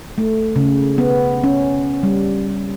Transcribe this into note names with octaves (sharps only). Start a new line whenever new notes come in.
A3
C#3
B3
C#4
G3